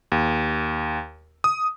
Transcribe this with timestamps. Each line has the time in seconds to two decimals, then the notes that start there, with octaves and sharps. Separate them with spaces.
0.12 D#2
1.44 D#6